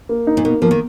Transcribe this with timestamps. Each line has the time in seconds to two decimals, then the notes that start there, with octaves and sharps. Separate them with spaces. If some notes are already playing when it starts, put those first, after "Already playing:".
0.09 A#3
0.27 D#4
0.37 A#2
0.45 B2 A#3
0.62 F3 A#3
0.71 D#3